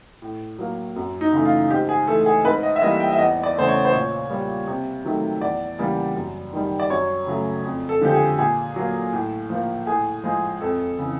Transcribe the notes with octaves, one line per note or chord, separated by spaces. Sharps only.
A2
F#3 A#3
F#2
D#4
C#3 E3 A3
F4
G#2 G4
G#4
E3 A3 A4
G#4
G#2 B4
D#5
E5
E3 G3 A#3 D#5
G5
E5
E2 D#5
D5
C#3 E3 A3 C5
C#5
C5
A#2 C#5
G3 A#3
C3
D#3 F#3 A3
E2 D5
C#3 E3 G3 A#3
F#2
D#3 G3
D5
F#2 C#5
C#3 F#3 A3
F2
A4
D3 F3 G#3 G4
G#4
A#2 G#4
F#3 A#3
A2
F3 A#3
A2 G#4
F3 G#3
F2 A4
C#3 E3